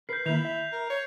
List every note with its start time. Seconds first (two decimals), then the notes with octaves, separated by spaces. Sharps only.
0.09 A#4 B4 G6 C7
0.26 D#3 A#3 E4 G6 F7
0.45 E5
0.72 A#4
0.90 C#5